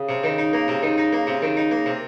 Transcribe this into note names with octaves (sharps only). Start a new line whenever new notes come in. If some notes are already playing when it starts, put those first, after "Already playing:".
Already playing: C#3
C3
D#3
D#4
A#3
C3
D#3
D#4
A#3
C3
D#3
D#4
A#3
C3